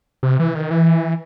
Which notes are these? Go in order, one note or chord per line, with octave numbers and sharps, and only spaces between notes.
C3
E3
D#3
E3